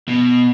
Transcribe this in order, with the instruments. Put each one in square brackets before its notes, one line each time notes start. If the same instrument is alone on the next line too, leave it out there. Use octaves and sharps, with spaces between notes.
[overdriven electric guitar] B2